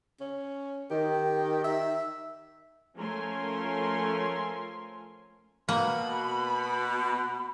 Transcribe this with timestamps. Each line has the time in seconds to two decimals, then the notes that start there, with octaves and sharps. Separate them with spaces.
0.20 C#4
0.90 D#3 G4
1.64 E5
2.96 F3 A3 C#4 A#4 G#5 C6
5.69 B2 A#3 B5